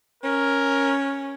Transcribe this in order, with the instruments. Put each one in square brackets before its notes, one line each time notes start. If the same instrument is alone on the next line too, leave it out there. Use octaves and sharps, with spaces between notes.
[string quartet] C#4 [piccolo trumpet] A#4